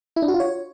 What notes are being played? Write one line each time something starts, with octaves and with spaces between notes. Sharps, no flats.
E4
D4
F#4
F4
C#5